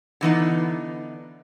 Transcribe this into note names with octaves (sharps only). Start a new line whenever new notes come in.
D3 E3 B3 D#4